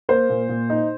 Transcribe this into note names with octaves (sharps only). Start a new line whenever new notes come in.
A#3 C5
A#2
A#2
D#4